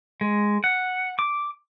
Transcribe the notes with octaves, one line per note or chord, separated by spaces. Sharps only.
G#3
F#5
D6